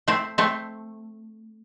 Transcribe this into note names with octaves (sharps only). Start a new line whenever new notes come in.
A3 C4
A3 C4